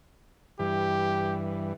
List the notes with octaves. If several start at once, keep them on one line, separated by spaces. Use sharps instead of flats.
G2 E3 G4